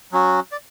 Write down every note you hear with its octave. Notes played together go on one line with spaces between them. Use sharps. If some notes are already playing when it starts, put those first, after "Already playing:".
F#3 C#4 F#4
D5